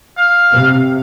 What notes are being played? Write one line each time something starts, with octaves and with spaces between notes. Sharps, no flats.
F5
C3